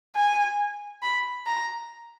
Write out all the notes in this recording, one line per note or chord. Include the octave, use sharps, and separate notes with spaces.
G#5
B5
A#5